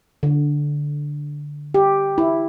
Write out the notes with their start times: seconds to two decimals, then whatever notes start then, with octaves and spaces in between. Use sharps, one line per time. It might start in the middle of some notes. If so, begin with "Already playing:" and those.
0.23 D3
1.74 G4
2.18 E4